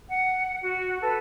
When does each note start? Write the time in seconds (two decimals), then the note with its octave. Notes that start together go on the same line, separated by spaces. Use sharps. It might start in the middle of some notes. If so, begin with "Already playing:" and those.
0.09 F#5
0.61 F#4
1.01 A4 B4